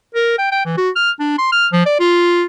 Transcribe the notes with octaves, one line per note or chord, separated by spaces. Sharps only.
A#4
G5
G5
E3
F#4
F6
D4
C6
F6
F3
D5
F4